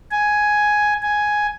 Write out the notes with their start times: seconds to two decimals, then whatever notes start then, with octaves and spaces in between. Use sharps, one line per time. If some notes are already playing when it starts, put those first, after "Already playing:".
0.11 G#5
1.03 G#5